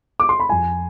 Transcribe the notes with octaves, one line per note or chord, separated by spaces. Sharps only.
D6
C6
B5
F2 G#5